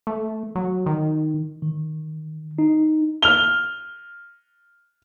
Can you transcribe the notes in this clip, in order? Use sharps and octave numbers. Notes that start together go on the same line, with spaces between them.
A3
F#3
D#3
D#3
D#4
F6 F7 G7